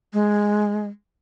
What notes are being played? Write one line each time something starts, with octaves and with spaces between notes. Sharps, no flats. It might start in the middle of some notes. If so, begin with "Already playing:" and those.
G#3